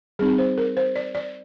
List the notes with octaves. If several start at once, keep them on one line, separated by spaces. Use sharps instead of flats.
G3 C4 D#4 G#4
C5
A#4
C5
D5
D5